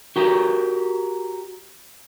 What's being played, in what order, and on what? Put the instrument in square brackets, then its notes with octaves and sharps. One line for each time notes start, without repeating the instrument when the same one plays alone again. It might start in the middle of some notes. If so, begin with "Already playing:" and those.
[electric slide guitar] F#4 G4 A#4